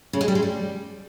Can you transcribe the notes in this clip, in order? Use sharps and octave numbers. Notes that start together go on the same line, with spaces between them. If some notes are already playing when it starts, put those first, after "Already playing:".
C#3
G#3
G3
G#3
G3